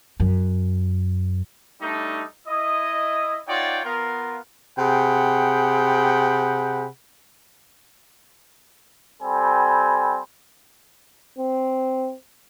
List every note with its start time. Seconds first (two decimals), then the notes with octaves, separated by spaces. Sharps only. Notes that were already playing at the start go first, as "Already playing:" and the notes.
0.20 F#2
1.81 G3 A3 D4 D#4
2.47 E4 D#5 D#6
3.48 D#4 F4 C#5 D5 F#5 G5
3.84 B3 F4 A#4
4.78 C3 G#4 F#5 G5 B5
9.22 G3 C4 A4 G#5 B5
11.38 C4